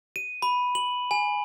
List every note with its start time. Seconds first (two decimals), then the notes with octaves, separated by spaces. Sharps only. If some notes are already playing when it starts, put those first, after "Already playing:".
0.16 D#7
0.42 B5
0.75 F#7
1.11 G#5